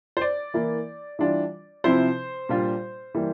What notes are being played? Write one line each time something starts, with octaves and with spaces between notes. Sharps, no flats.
C5
D5
E3 A#3 E4
E3 G3 D4 F4
C3 F3 C4 E4 C5
A#2 G3 D4 F4
E3 G3 A#3